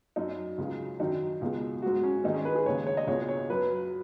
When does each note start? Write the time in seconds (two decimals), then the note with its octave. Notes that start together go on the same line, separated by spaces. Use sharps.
0.16 F#2 F#3 D#4
0.58 C#2 C#3 F#3
1.00 F#2 D#3 F#3 D#4
1.41 C#2 B2 G#3
1.82 G#2 F#3 F#4
2.04 C#4
2.24 G#2 D#3 G#3 D#4
2.34 C#4
2.45 B4
2.55 G#4
2.66 D#2 C#3 G#3 C#5
2.87 C#5
2.97 D#5
3.07 C#2 B2 G#3 C#5
3.29 C#5
3.49 F#2 F#3 B4